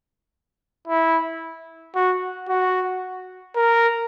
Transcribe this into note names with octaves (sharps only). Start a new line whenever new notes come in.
E4
F#4
F#4
A#4